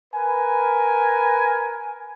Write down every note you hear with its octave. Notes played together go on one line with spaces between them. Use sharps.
A#4 B4 G#5